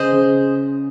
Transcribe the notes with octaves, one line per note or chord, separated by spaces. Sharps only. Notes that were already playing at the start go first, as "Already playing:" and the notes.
Already playing: C#3 G#4 C5 D#5
C#3